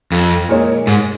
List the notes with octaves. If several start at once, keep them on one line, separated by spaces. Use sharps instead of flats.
F2
A#2 G#3 D#4 C#5
G#2